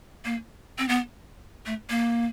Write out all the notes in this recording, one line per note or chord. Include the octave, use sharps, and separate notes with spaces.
A#3
C4
B3
A3
A#3